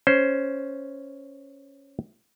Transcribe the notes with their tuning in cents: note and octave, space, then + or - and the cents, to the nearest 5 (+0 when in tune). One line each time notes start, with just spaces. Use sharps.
C#4 +0 C5 +0